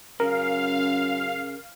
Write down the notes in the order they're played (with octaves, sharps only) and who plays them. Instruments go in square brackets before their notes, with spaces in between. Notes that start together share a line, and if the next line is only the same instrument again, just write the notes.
[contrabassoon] F#2 [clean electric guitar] C#3 [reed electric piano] A#4 [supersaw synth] F5